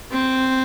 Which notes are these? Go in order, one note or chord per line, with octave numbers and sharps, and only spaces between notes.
C4